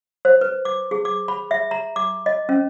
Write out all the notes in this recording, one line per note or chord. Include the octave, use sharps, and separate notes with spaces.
C5
B4
D6
G#4
D6
B5
E5
A#5
D6
D#5
C#4